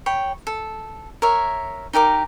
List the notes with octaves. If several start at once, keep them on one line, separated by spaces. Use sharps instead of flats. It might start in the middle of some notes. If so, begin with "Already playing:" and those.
C#5 G5 B5
A4
A#4 C#5 E5
D#4 G4 A#4 D6